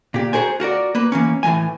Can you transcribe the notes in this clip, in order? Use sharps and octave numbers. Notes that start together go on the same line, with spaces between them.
A#2 G4
F#4 G#4 A#4 C5 G#5
F4 F#4 A#4 D5
A#3 B4
E3 A#3 C#4
A2 E3 F#3 G#3 G#5